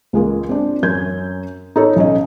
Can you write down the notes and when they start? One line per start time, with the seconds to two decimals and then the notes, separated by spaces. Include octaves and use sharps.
0.13 C#2 G#3 A#3
0.49 C4 D4
0.83 F#2 C#4 G6 G#6
1.76 D#4 A4 C#5
1.96 B1 C#4 D#5